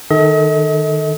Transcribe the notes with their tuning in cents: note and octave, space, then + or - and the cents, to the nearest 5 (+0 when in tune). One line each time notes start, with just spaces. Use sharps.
D#3 -20 A4 +0 D#5 +40